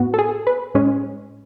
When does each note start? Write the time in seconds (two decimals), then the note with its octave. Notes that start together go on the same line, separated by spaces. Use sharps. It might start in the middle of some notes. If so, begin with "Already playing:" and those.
Already playing: A2 B3 F#4
0.14 A4
0.19 G#4
0.47 B4
0.75 A2 G#3 C#4